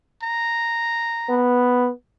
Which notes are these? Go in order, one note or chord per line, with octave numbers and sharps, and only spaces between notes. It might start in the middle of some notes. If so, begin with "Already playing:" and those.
A#5
B3